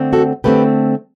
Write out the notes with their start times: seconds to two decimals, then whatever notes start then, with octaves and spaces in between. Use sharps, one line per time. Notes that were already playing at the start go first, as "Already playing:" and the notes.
Already playing: D3 A3 C4
0.13 F#4 A4
0.44 D3 A3 C4 G4 B4